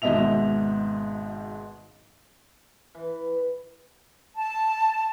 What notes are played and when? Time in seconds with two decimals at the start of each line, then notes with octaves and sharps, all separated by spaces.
0.02 G#1 G#2 B2 D#5 E5 F7
2.95 E3
4.36 A5